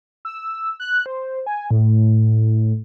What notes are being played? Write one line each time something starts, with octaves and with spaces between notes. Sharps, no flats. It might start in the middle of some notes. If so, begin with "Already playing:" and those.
E6
F#6
C5
G#5
A2